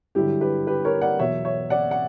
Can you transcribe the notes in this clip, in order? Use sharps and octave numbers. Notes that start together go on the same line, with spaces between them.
G2 D3 F#3 E4 G4
G4 B4
G4 B4
A#4 C#5
D5 F#5
E2 B2 F#3 C#5 E5
C#5 E5
D5 F#5
F#5